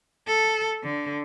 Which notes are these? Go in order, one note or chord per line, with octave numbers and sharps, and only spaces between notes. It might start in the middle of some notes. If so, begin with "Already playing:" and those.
A4
D3